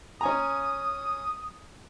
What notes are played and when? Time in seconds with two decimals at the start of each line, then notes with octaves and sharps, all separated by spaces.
0.21 C#4 G#5 A#5 D#6